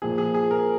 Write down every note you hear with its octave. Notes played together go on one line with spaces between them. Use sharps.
A#2 F3 A#3 G#4
G#4
G#4
A#4